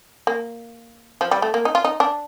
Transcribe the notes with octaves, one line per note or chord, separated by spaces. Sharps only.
A#3
F3
G3
A3
A#3
D#4
F4
D#4
D4